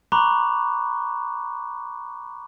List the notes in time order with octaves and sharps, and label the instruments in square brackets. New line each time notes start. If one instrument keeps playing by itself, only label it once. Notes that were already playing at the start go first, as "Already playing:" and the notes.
[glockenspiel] A#5 B5 C#6 D6 F#6